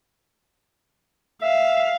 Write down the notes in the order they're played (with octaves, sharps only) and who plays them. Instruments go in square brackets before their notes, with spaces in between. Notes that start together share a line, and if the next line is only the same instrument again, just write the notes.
[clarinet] E5 [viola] F5